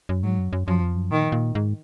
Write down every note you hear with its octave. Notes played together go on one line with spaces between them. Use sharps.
F#2
G#2 F#3
F#2
F#2
F#2 F3
F2
F#2
A#2 D#3
A#2
G#2